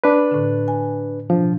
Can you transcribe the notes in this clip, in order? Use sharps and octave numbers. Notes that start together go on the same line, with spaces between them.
D4 B4
A2 D3
G#5
B2 F3 D4